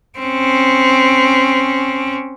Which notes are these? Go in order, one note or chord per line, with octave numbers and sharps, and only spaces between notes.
C4 C#4